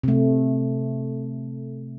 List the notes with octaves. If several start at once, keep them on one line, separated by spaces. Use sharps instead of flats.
C3 A3